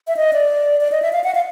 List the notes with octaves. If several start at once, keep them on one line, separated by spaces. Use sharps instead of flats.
E5
D#5
D5
D5
D#5
E5
F5
F#5
F5